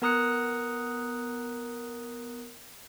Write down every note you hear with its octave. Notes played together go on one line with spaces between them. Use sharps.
B3 A#4 A#5 D#6 F#6 C#7